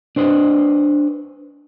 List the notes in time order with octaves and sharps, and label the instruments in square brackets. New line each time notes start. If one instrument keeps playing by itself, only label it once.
[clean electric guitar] D4 B4 C5 D#5